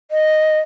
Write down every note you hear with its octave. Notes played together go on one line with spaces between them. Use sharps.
D#5